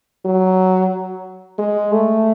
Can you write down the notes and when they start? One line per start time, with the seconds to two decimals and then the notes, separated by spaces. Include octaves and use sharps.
0.25 F#3
1.58 G#3
1.92 A3